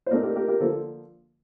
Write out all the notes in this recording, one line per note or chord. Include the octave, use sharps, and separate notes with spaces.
C5
A#2 A3 C4 D#4 A#4 D5
G4 A#4
G4 A#4
G4 A#4
D3 F3 A#3 A4 C5